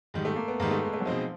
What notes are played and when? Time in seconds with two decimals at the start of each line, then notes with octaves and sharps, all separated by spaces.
0.14 G#2 D#3 G3
0.25 A3
0.36 A#3
0.48 B3
0.60 G#2 D#3 G3 A#3
0.71 A3
0.83 G#3
0.93 A3
1.00 F#3
1.05 B2 F3 G#3 C4 D#4